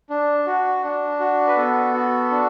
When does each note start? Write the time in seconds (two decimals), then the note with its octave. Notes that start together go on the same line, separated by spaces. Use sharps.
0.10 D4
0.47 F#4
0.84 D4
1.20 F#4
1.47 B4
1.57 B3 A4
1.94 F#4
2.31 D4